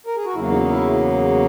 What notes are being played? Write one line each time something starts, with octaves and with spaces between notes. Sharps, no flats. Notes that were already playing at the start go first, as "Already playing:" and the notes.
A#4
G#4
F#4
E2 C#3 F#3 A#3 E4
D#4
E4